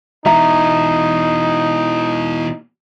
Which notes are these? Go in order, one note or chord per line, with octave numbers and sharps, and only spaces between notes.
B2 E3 D#4 E5 A#5